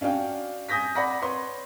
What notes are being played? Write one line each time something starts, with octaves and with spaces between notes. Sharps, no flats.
C#4 D4 F#4 F5 G5
G#5 D#6 G6 A#6 B6
D5 F#5 B5 A#6
B4 C#5 C6